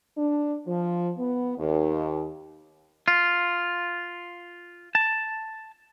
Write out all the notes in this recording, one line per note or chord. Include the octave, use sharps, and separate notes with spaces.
D4
F3
B3
D#2
F4
A5